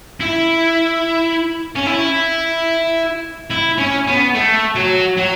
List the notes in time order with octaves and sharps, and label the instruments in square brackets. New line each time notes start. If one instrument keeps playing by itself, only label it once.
[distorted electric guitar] E4
C#4
E4
E4
C#4
B3
A3
F#3
F#3